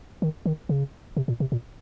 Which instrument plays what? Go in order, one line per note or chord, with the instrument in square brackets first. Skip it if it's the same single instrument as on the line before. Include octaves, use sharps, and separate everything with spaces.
[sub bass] D#3
D#3
C#3
C3
A#2
C3
A#2